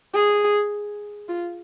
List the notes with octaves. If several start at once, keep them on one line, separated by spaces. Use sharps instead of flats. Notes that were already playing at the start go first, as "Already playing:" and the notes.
G#4
F4